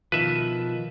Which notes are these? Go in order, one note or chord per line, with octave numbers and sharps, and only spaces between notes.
B2 D#3 F3 B4 E5